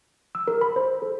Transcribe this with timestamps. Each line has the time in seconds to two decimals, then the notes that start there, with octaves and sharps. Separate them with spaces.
0.35 E6
0.48 A#4
0.61 B5
0.76 C5
1.02 A4